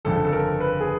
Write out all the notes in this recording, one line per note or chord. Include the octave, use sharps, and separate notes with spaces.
G1 F2 C#3 A4
A4
A#4
B4
G#4